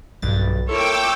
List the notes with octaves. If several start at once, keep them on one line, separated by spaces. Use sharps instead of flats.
B1 G2 A6
A#3 E4 F4 A4 C#5 G5 D6 E6